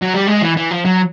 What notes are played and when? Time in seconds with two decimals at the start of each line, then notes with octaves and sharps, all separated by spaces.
0.02 F#3
0.15 G3
0.28 G#3
0.42 E3
0.57 E3
0.71 F3
0.85 F#3